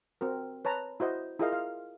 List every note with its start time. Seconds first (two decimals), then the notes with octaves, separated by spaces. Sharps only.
0.21 C4 F#4 A#4
0.65 B4 C#5 A5 A#5
1.00 E4 F#4 C5 D#5
1.40 E4 F4 G#4 A#4 D#5 F5
1.53 F5